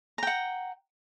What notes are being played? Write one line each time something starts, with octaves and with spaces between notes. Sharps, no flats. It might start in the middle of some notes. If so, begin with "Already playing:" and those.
F#5 G5 A#5